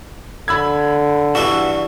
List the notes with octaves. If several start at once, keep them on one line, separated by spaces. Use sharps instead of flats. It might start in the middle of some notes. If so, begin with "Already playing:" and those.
D3 B5 E6 G#6
G2 E3 D4 F#4 E5